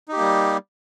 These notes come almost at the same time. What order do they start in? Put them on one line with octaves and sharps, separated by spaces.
D#4 G4 A#3 G3